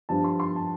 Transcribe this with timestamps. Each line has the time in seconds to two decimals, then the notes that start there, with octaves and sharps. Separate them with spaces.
0.09 G2 F3 D4 A5
0.24 C6
0.40 C6
0.56 A5